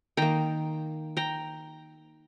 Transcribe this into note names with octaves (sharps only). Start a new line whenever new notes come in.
D#3 A#3 G5 A#5
G5 A#5